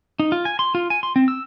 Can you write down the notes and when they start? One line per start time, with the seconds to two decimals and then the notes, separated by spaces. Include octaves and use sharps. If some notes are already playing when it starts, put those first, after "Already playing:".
0.19 D#4
0.32 F4
0.45 G#5
0.59 C6
0.75 F4
0.90 G#5
1.03 C6
1.16 C4
1.28 E6